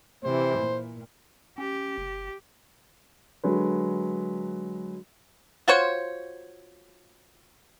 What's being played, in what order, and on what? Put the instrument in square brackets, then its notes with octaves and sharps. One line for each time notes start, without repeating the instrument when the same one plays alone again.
[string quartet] C3 E3 [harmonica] C5
[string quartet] A#2
[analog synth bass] C#4 [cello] G4
[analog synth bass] F#1
[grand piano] D3 F#3 G#3 B4
[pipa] F4 F#4 C5 C#5